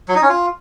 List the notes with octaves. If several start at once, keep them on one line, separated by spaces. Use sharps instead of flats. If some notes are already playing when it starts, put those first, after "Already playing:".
F#3
D#4
C#4
F4